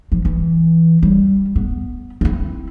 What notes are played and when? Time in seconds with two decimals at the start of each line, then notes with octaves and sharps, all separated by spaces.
0.12 F3
0.25 E3
1.03 G3
1.56 B3
2.21 C4 E4